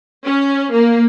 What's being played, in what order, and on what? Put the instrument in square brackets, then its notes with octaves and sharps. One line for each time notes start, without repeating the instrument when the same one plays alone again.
[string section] C#4
A#3